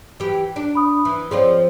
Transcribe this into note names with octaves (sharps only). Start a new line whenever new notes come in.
E3 G4
D4
B5 D#6
E3
F3 C4 F4 G#4 C#5 D5